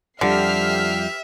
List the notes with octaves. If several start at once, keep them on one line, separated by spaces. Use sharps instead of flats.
F2 D3 F3 G3 G4 E5 F6 C7